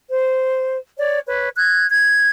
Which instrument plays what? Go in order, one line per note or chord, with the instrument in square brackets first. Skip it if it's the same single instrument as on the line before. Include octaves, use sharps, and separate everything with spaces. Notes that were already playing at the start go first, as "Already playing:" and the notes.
[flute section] C5
C#5 D5
B4 C#5
F#6 G#6
G#6